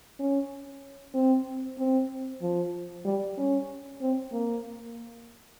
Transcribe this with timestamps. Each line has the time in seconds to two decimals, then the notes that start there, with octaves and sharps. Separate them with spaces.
0.19 C#4
1.14 C4
1.78 C4
2.42 F3
3.05 G3
3.37 C#4
4.01 C4
4.32 A#3